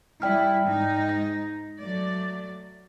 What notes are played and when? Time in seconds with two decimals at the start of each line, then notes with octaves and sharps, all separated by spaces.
0.22 G3 E4 D5 G5 F6
0.66 G#2 D#4
1.09 A#6
1.81 F#3 A3 D5